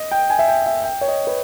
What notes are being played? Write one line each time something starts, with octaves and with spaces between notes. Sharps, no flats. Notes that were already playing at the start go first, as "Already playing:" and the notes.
Already playing: D#5
G5
G#5
E5
G5
E5
G5
C#5
D#5
B4